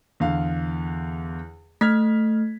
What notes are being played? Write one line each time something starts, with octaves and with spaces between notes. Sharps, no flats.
E2 D3 F5
A3 F6 G#6 B6